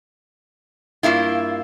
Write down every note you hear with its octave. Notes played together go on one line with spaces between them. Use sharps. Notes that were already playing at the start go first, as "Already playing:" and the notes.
G2 A#3 E4 F4